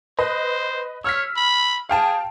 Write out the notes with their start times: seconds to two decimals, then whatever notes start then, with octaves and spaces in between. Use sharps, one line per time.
0.19 B4 C5 D#5
1.04 C#5 E6 F6 B6
1.36 B5
1.89 G#4 F5 G5 A5